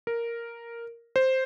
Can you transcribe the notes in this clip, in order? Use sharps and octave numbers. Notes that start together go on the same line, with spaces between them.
A#4
C5